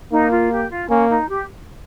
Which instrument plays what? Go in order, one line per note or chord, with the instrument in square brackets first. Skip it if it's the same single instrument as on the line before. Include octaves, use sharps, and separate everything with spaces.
[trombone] A#3 [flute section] D#4
[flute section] F4
G4
F4
[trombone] A#3 [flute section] C#4
[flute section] D#4
G4